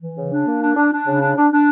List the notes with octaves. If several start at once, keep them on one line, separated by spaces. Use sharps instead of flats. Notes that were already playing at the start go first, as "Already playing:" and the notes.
E3
C#3
D4
A#3
D4
D4
D4
C#3
D4
D4
D4